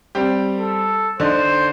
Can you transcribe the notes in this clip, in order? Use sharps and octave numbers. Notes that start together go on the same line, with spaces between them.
G3 C4 G4
A4
D3 D4 D#4 C5